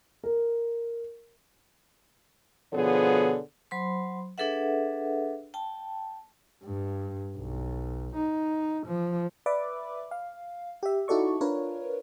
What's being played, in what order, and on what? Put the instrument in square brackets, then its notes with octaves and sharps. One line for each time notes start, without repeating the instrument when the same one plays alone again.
[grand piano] A#4
[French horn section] B2 D3 F3 B3 G#4 C#5
[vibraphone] F#3 C5 B5 C6
D4 G#4 A4 B4 E5 F#5
G5 A5
[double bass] G2
B1
D#4
F3
[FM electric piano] B4 D5 E5 D6
F5
G4 E5
D#4 E4 F#4 A4 D5 C#6
D4 F4 A#4 B4 C#5